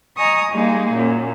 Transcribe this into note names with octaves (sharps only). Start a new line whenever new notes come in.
D#5 G#5 A#5 C#6 D#6
G3 G#3 A#3 D#4 G#4
F#2 A#2